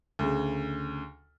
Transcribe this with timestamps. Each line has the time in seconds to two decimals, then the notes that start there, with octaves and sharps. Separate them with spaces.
0.19 D2 C#3